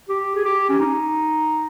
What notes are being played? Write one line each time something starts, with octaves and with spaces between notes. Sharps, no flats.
G4
G#4
G4
C#4
D#4